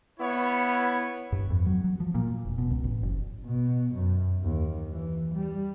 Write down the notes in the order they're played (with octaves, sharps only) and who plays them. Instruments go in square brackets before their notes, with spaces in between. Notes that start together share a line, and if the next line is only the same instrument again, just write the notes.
[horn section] B3 E4 C#5
[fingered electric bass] G2
F2
F#3
F#3
F3
A#2
E1
B2
C#2
A1
F#1
[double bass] B2
F#2
D#2
E3
G3